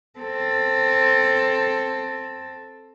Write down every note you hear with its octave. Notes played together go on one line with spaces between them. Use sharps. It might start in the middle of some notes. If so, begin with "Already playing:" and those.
C4 A4